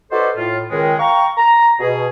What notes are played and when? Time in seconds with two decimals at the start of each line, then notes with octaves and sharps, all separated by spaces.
0.12 D#4 F#4 A4 B4 C5 D5
0.36 A2 F4
0.70 C#2 D#3 G#3
0.99 F5 G5 A#5 C#6
1.37 A#5
1.80 B2 G#4